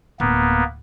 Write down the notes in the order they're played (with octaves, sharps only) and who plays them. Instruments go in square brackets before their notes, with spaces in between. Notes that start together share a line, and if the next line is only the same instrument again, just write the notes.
[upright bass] D1 [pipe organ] A#3 B3